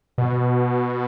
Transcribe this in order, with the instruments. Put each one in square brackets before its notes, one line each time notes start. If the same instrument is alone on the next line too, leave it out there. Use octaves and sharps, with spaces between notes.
[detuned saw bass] B2